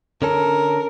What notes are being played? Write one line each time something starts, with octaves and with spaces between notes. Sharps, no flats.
D3 C#4 A4 A#4